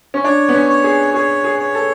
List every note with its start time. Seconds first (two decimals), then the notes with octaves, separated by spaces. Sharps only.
0.14 C#4
0.24 D4 C#5
0.49 B3
0.54 C#4
0.69 C#5
0.84 G#4
1.14 G#4 C#5
1.44 G#4
1.60 C#5
1.75 A4